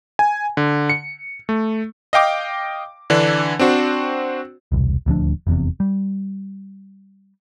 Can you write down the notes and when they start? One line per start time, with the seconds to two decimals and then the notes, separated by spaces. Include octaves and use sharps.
0.19 G#5
0.57 D3
0.90 C#7
1.49 A3
2.13 D#5 F5 G5 D6
3.10 D3 E3 D4
3.59 C4 D4 F#4 C5
4.72 E1 C2
5.06 D#1 D2 F3 D4
5.47 F1 E2 C3
5.80 G3